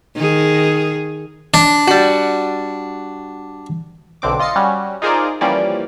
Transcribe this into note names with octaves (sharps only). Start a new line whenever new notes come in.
D#3 G#4
D4
G3 F#4
B1 D3 C4 D6
F4 D#5 A6 C7 C#7
G3 C#4 F#4
D#4 F4 G#4 A#4 C5 D5
E3 F3 G3 A#3 C#4 D5